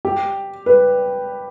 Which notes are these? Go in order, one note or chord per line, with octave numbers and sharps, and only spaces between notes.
G4
B4